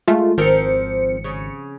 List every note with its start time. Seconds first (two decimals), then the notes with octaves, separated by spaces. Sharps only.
0.08 G#3 A3 F4
0.38 G#1 F3 C4 A#4 C#7
1.24 C#3